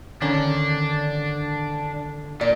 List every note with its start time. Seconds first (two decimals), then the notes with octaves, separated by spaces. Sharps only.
0.22 D3 D#3 C#4 D4
2.41 A#2 D5